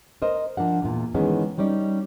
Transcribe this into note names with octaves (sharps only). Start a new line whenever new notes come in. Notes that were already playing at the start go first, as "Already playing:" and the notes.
A#4 C5 D#5
F3 D4 A#4 F#5
E2 A#2
D#3 E3 G#3 B3 C#4
G3 C#4 D#4 D5